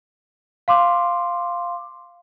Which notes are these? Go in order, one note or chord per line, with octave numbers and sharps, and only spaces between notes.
F5 C6 D6